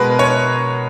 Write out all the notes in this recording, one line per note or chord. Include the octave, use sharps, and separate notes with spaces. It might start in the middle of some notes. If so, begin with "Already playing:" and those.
Already playing: B2 G#3 A#4 B4
C#5